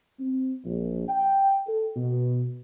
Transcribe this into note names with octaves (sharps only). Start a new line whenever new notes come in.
C4
A#1
G5
A4
B2